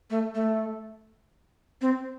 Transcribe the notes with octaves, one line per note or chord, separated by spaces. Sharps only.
A3
A3
C4